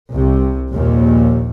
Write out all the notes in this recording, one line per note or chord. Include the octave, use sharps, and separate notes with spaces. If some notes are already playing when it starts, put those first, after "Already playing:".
C2 C3
A#1 D#2 A#2